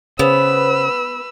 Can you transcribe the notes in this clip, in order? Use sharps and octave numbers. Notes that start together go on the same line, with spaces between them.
C#3 B3 B4 C5 E6